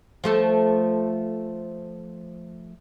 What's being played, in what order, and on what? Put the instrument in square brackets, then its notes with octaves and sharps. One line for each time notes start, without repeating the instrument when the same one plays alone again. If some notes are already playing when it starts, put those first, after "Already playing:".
[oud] F3 A3 A4